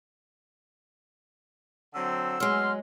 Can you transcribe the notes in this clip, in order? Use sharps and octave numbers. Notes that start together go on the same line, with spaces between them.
D3 F#3 C4 E6
F#3 G#3 B3 G#4 C6 F6